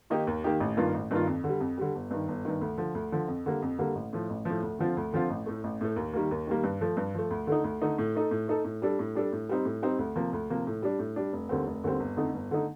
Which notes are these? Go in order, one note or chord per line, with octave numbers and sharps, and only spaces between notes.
D#3 A#3 D#4 G4
D#2
D#3 A#3 D#4 G4
A1
G2 D#3 A#3 F4
A1
G2 D#3 A#3 F4
F2
D3 G3
F2
D3 G3
G1
G2 D#3
G1
G2 D#3
D2
D3 F3
D2
D3 F3
F2
D3 G3 A#3
F2
D3 G3 A#3
A1
A2 F3
A1
A2 F3
D2
D3 F3 C4 F4
D2
D3 F3 C4 F4
A1
A2 A3
A1
A2 A3
D#2
D#3 G3 A#3
D#2
D#3 G3 A#3
G2
F3 A3
G2
F3 A3
D2
D3 A3 D#4
D2
D3 A3 D#4
A2
A3 D#4 A4
A2
A3 D#4 A4
A2
G3 D4 A4
A2
G3 D4 A4
A2
G3 C4 D#4
A2
G3 C4 D#4
D2
C3 F3 A#3
D2
C3 F3 A#3
A2
G3 D4
A2
G3 D4
F1
D#2 D3 G3 C4
F1
D#2 D3 G3 C4
G1
F2 D3 A3 D#4
G1
D3 A3 D#4